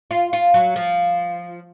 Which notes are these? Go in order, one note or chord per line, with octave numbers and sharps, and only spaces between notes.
F4
F4
F#3
F3